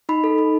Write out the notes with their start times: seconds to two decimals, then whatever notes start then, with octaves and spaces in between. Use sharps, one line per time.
0.09 D#4 B5
0.24 A4
0.38 D#4